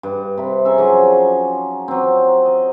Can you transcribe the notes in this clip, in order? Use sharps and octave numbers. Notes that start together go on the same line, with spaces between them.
G2
C3 B5
C#4 D#4 G#4 E5
F3 F#3 G#5
F#3 C4
D#5